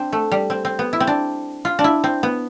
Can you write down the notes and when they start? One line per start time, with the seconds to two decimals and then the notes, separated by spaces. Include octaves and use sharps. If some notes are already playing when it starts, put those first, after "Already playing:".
Already playing: C4 D4
0.13 A3
0.32 G3
0.50 C4
0.65 C4
0.79 B3
0.93 E4
1.00 C4
1.07 D4
1.65 F4
1.79 D4
1.84 E4
2.04 C4
2.23 B3